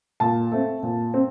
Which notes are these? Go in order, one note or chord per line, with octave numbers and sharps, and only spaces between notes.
A#2 A5
A3 C4
A#2
C4